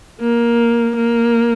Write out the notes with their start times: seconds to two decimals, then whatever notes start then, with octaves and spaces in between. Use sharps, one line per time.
0.20 A#3
0.96 A#3